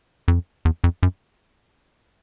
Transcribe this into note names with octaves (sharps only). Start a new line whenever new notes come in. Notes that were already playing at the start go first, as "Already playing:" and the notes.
F2
E2
F2
F#2